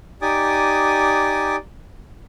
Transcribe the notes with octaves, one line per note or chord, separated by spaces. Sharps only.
D#4 G4 D5 G#5 D6 D#6